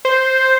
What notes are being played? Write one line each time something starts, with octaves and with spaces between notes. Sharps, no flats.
C5